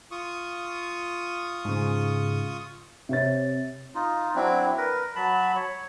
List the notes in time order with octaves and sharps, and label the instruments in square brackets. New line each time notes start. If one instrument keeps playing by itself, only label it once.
[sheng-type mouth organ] F4 C#6 D#6
[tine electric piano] G#2 C#3
[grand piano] C3 C#5 A6
[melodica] D#4 F4
F#3 C4 D4 E4
A#4 B4
F#3 A5 B5
C#5